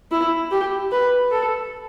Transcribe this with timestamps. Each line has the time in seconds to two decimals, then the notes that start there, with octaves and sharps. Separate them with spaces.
0.11 E4
0.51 G4
0.92 B4
1.31 A4